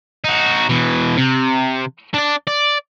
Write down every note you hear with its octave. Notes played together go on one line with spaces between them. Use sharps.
D#4 F#4
B2 E3
C3
D4 D5
D5